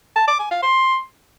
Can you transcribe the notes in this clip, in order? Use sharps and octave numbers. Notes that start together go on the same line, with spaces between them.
A5
D6
G#5
F5
C6